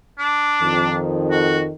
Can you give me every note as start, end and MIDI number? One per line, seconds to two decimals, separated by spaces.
0.18 0.95 62
0.60 1.72 41
0.60 1.72 51
1.31 1.59 66